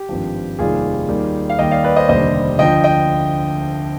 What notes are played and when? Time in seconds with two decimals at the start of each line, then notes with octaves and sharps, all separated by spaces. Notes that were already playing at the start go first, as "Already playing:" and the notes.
Already playing: G4
0.09 G#1 G2 F3
0.59 F1 D#2 D#3 G3 F4 G#4
1.09 D#2 D#3 G3
1.50 F5
1.59 D#2 D#3 G3 D#5 G5
1.71 D5 F5
1.84 B4 D5
1.96 C5 D#5
2.09 F1 D#2 D3 G3 C5 D#5
2.59 D2 D3 F3 D#5 G5
2.84 D#5 G5